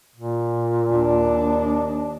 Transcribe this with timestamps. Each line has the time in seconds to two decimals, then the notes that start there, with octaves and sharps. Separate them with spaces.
0.16 A#2
0.90 D#2 D4